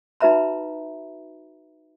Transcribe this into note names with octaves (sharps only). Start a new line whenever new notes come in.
D#4 F#4 B4 E5 A#5 B5